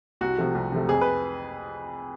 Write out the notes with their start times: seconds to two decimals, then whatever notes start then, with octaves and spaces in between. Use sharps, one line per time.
0.21 C2 F#4
0.38 C3 F3 A3
0.55 C2
0.72 C3 F3 A3
0.89 F2 G#4
1.01 B4